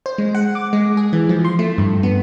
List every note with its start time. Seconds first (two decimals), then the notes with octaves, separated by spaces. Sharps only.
0.06 C5
0.18 G#3
0.35 F#5
0.55 D6
0.73 G#3
0.97 G#4
1.13 E3
1.29 F3
1.45 C6
1.59 A3
1.78 G2
2.03 B3